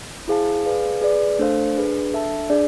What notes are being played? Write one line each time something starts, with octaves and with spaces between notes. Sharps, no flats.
E4 G#4 C5 F5 A5
G#4 B4 D5 F5
G#4 B4 D5
A3 D4 A4 C5 F5
D4 G#4 B4
D4 A4 E5 A5
D4 G#4 D5